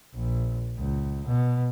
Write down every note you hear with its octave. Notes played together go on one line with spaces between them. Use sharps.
A#1
C#2
B2